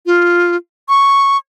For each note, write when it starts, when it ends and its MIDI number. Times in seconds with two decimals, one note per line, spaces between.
0.06 0.56 65
0.89 1.37 85